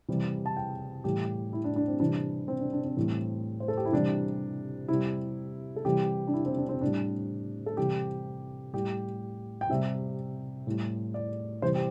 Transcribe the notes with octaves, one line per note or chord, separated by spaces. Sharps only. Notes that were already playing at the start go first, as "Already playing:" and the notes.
C3 E3 G3
A5
G5
A2 E3 G3 G4
E4
D4
D4
C4
C3 E3 G3 D4
C4
D4
D4
C4
A2 E3 G3
C5
A4
G4
E4
C3 E3 G3 D4
C3 G3 E4
A4
C3 E3 G3 G4
D4
E4
C4
D4
C4
A2 G3 D4
A4
C3 E3 G3 G4
A2 G3 G4
G5
C3 G3 E5
A2 G3
D5
C3 E3 G3 C5
G4